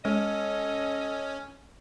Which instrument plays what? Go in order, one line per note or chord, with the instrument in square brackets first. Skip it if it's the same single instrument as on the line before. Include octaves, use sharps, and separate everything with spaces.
[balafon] G#3 [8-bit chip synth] C#4 [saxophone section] A4 D#5